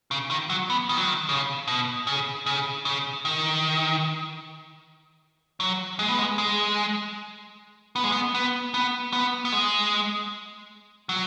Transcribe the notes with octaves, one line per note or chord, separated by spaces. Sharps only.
C#3
D#3
F#3
B3
D#3
F#3
D#3
C#3
B2
C#3
C#3
C#3
D#3
F#3
G#3
B3
G#3
G#3
B3
G#3
B3
B3
B3
B3
B3
G#3
F#3